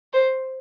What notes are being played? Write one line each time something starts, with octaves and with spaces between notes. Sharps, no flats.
C5